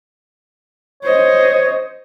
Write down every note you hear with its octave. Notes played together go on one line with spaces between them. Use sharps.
C5 C#5 D#5